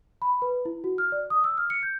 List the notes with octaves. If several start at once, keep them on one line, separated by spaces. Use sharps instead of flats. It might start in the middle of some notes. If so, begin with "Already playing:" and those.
B5
B4
E4
F#4
F6
D5
D#6
E6
F6
C#7
G6